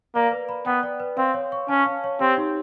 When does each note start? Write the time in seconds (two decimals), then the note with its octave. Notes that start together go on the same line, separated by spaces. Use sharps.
0.15 A#3 D5
0.31 B4
0.49 B5
0.66 B3 G5
0.83 D5
1.00 B4
1.17 C4 F5
1.34 C#5
1.52 C#6
1.69 C#4 A5
1.86 F5
2.04 C#5
2.20 C4 G4
2.37 D#4